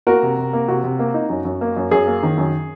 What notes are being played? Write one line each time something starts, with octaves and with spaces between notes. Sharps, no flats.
A#3 F#4 A#4
C3
C3
A#3
C3 F#4
C3
A#3
D#4
F#2
F#2
A#3
F#2
F#2 G#4
A#3
D#3
F#2